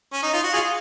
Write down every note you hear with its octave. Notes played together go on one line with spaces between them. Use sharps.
C#4
D#4
F4
F#4
F4 G#4